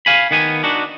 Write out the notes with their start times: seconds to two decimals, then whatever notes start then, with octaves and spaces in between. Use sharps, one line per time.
0.06 F5 G#5 B5
0.31 D#3 B3 G#5
0.64 D4 D#4 F#4